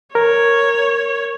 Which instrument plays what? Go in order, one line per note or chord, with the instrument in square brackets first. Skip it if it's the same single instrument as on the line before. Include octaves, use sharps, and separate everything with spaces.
[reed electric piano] A#4 [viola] C#5